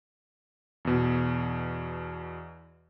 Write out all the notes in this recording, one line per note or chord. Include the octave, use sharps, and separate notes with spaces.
E2 B2